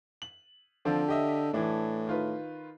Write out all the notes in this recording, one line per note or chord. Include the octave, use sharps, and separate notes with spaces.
F#7
D3 F3 C4
G4 D#5 E5
A2 E3 D4
D#3 F4 B4